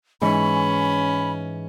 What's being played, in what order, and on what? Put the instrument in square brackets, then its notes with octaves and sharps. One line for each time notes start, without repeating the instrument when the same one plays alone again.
[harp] G#2 E3 C#6 [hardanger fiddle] C#4 [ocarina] B5